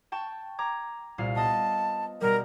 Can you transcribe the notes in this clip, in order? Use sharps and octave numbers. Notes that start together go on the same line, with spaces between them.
G5 A5 C#6
A#5 D6 G#6
C2 A#2 F5
B3 D#5 A5
B2 G3 A#4